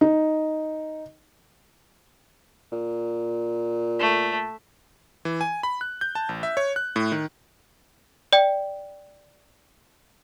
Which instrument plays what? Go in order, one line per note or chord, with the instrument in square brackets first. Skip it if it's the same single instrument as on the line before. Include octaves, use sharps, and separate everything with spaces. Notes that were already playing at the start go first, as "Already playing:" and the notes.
[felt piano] D#4
[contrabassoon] A#2
[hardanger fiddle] A3
[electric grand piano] E3
G#5
B5
F#6
G6
A5
A1
E5
C#5
F#6
A2
D#3
[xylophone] D5 G5